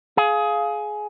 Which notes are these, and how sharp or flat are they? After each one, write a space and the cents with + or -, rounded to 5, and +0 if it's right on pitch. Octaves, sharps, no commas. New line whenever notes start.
G#4 +20 F5 +5